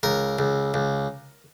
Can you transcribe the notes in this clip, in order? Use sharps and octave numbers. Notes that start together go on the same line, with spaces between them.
C#2 A#4
C#2
C#2